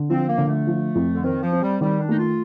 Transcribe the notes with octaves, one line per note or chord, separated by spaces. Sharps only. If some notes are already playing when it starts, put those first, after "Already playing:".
Already playing: D3
F3 C4
A#3
D3
A3
F3
F2
D3
D#3 C4
F3
C4
G3
D#3 G3
D4
A3 D#4
F4